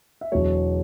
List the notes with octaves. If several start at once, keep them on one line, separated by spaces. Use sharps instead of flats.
E5
E1 E2 B2 F#3 C#5